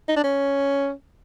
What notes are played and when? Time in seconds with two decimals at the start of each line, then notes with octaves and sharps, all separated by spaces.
0.08 D#4
0.16 D4
0.24 C#4